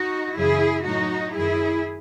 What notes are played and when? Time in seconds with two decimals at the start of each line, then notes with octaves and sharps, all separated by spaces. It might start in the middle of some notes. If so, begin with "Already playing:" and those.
Already playing: D#4 F#4
0.35 F#2 C#3 E3 E4 G#4
0.85 A2 F#3 D#4 F#4
1.35 F#2 D#3 F#3 E4 G#4